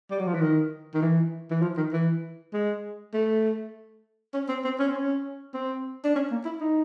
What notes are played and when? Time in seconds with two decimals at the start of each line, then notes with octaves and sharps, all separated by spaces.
0.11 G3
0.19 F#3
0.27 F3
0.34 E3
0.41 D#3
0.94 D#3
1.02 E3
1.50 E3
1.62 F3
1.77 D#3
1.92 E3
2.53 G#3
3.14 A3
4.34 C#4
4.49 C4
4.64 C4
4.79 C#4
4.88 C4
4.95 C#4
5.54 C4
6.04 D4
6.16 C#4
6.31 A#3
6.45 E4
6.60 D#4